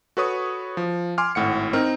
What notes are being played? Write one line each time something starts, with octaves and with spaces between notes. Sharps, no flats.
F#4 A4 B4 C#5 C#6 D#6
F3
G#5 C6 D6 F6
G#1 A2 F#5 C#7
C4 D#4 A#4 F6